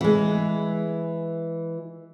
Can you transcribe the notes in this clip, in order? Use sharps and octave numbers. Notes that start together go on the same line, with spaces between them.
E3 G#3